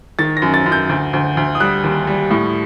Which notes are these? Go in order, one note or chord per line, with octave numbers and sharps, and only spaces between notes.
D#3 A6
A#6
F#2
A6
F#2
G6
D2
D2
D2
D#6
G3 F#6
D#2
G3
A2